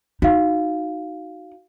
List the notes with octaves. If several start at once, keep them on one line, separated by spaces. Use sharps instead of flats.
D#4 F#4 F5